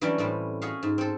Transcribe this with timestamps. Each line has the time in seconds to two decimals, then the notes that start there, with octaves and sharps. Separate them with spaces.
0.01 E3 F#3 G3 C#4 D4 G#5
0.18 A2 G3 C4 C#4
0.62 F#4 G#4 C#5 E5 F5
0.83 G#2
0.98 C4 A4